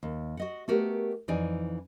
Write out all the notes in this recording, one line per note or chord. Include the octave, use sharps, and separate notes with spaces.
D#2
F#4 D#5 F#5
A3 B3 F#4 G4 A#4
F2 E3 D#4 D5 G#5